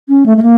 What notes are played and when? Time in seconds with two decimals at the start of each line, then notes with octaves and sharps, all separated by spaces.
0.09 C#4
0.26 A3
0.37 A3
0.42 A#3